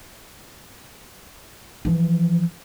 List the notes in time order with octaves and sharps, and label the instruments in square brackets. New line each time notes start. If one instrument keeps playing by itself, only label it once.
[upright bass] E3 F3